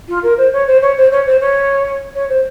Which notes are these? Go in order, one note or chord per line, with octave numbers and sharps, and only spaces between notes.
F4
A#4
C5
C#5
C5
C#5
C5
C#5
C5
C#5
C#5
C5